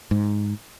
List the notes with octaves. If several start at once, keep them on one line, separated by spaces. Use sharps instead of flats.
G#2